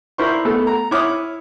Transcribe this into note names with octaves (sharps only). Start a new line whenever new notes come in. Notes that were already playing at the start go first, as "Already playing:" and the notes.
D4 E4 A#4 C5 C6 C#6
A3 B3 A4
A#5
E4 C#5 D6 D#6 F6